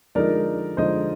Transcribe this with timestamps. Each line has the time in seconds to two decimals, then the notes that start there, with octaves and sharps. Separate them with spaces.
0.15 D3 F3 G#3 D#4 A#4 D5
0.77 D3 F3 G#3 D#4 C5 D#5